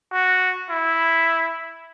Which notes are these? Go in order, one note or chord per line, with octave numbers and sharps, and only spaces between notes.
F#4
E4